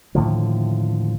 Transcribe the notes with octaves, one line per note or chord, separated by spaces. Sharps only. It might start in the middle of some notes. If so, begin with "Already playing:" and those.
D#2 A2 D3 F3